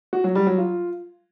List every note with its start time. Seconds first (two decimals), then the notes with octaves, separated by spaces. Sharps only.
0.13 F#4
0.24 F#3
0.35 G3
0.47 F#3
0.58 F4